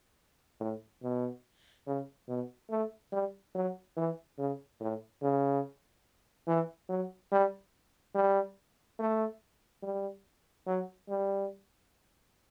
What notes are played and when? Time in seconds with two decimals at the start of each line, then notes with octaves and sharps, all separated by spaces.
0.60 A2
1.03 B2
1.87 C#3
2.29 B2
2.70 A3
3.13 G3
3.55 F#3
3.97 E3
4.38 C#3
4.81 A2
5.22 C#3
6.48 E3
6.89 F#3
7.32 G3
8.15 G3
8.99 A3
9.83 G3
10.67 F#3
11.09 G3